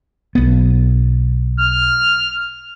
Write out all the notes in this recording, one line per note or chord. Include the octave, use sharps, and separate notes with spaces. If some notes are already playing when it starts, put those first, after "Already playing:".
B1 B3
F6